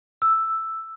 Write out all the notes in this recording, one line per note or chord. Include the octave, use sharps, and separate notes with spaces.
E6